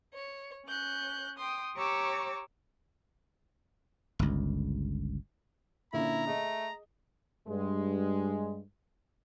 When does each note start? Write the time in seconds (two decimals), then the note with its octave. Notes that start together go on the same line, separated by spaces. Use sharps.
0.14 C#5
0.67 C#4 F#6 G6
1.37 G5 C6 D#6
1.76 G4 C#5 A#5 C#6 D6 E6
4.19 G1 C#2
5.94 A#2 D3 C#4 E4 A#5
6.27 A3 G#4 D#5
7.47 G2 G#3